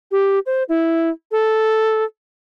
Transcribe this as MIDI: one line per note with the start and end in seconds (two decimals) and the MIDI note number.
0.11 0.39 67
0.46 0.63 72
0.69 1.10 64
1.31 2.04 69